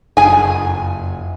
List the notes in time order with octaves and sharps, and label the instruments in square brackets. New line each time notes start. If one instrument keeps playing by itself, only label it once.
[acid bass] F#1 [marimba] F2 [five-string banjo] G#4 G#5